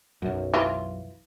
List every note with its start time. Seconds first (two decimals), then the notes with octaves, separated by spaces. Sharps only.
0.22 B1 F#2
0.54 E3 F4